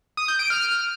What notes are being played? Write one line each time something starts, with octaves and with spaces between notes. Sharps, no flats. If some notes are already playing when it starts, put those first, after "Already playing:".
D#6
G6
D7
F6